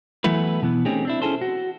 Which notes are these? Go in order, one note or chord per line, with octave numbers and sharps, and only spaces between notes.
E3 F#3 A3 B3 E4 B4
B2 E3 B3
A3 C4 C#4 D#4 G4 G#4
C4 D4 E4
C#4 E4 F#4 G#4 A4 C5
F#4